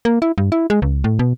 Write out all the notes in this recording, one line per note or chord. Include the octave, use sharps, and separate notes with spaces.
A#3
E4
G2
E4
G#3
C#2
A2
B2